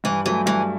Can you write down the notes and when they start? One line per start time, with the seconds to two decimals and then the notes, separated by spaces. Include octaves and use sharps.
0.04 G2 E3
0.25 E3 F#3 A3
0.46 G2 E3